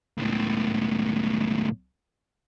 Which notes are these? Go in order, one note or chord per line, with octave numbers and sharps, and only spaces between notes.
C#2 A2